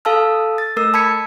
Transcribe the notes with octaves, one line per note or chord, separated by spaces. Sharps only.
A4 F5 A5 E6 F6
A6
A3 A#4 E6
A5 B5 G#6 B6 C#7